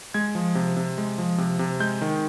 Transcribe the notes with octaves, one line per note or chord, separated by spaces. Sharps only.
G#3 G#6
F3
C3
C3
G#3
F3
C3
C3
G#3 G6
D#3